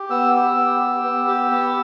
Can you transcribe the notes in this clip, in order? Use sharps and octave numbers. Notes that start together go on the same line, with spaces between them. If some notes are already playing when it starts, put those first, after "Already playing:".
Already playing: G4
B3 E6
G4 E6
B3
G4
B3
G4
B3